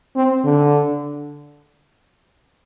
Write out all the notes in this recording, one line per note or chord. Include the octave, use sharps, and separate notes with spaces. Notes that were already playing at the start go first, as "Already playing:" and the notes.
C4
D3